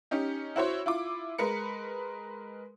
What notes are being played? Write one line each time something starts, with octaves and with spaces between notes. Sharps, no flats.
C#4 D#4 G4
E4 F#4 C5 C#5
E4 F4 D6
G#3 A#4 B4 C#7